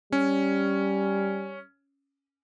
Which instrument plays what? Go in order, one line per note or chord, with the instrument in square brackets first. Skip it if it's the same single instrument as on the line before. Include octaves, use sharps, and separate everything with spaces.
[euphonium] G3 [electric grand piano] C#4